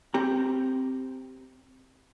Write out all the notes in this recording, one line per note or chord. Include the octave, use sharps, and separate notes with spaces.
C4 G4 A#5